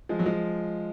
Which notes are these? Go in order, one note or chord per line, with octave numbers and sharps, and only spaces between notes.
F3 G#3
F#3
F3 G#3